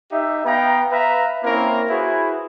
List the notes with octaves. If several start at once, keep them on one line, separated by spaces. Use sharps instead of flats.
D#4 G4 E5
B3 F5 G5 A#5
B4 E5 F5 A#5
A#3 C4 C#4 E4 A#4
E4 F#4 G#4 B4 C5